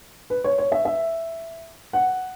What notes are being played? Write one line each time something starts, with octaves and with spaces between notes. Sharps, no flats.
B4
C#5
C#5
E5
E5
F#5